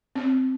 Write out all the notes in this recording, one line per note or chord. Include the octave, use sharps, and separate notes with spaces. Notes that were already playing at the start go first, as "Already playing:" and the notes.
C4